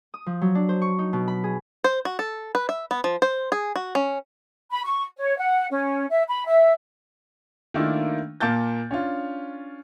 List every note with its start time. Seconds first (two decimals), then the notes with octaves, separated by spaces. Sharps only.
0.14 D#6
0.26 F3
0.41 F#3
0.55 D4
0.69 C5
0.82 C#6
0.99 D#4
1.13 B2
1.28 B5
1.44 G#4
1.84 C5
2.05 F#4
2.19 A4
2.55 B4
2.69 E5
2.91 B3
3.04 F3
3.22 C5
3.52 G#4
3.76 F#4
3.95 C#4
4.70 B5
4.84 C#6
5.17 C#5
5.36 F#5
5.70 C#4
6.09 E5
6.27 B5
6.46 E5
7.74 D#3 A3 A#3 D4 E4 F4
8.40 A#2 A#3 A5 G6 A6
8.91 C#4 D4 F4